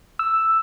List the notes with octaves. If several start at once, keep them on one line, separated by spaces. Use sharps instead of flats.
E6